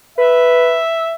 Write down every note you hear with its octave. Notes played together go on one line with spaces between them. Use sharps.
B4 E5